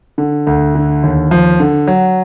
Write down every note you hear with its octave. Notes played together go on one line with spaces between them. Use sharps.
D3
D2
D3
D#2
F3
D3
F#3